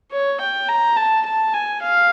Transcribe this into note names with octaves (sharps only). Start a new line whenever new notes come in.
C#5
G5
A#5
A5
A5
G#5
F5